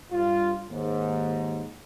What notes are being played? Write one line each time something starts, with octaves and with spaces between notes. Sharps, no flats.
G2 F4
D#2 G#2